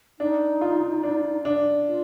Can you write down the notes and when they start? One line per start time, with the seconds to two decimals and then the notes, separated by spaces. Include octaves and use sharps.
0.19 D4 D#4
0.61 F4
1.03 D4
1.45 D4
1.87 F4